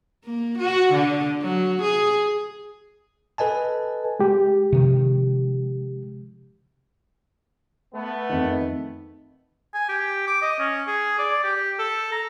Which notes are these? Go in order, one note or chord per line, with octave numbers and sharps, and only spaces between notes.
A#3
F#4
D3
F#3
G#4
A4 B4 D#5 G#5 A5
G#3 G4
C3 D#3 F3
A3 B3
F2 D#3
G#5
G4
D6
D#5
C#4
G#4
D5
G4
A4
A#5